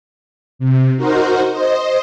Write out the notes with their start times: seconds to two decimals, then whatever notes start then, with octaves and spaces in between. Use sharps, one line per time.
0.59 C3
0.96 D#4 F#4 A#4 C5
1.51 C5 D#5